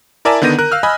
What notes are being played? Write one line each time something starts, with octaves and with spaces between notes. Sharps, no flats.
E4 A#4 D5 E5 G#5 A5
D3 D#3 B3 G6 A#6 D#7
A#4 F#6
F5 E6 F6
D#5 G#5 B5